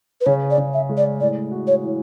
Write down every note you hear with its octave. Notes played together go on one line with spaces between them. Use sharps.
B4
C#3 C#5
D5
C#3
E5
G#3
D5
A2 D5
F#4
C#5
E3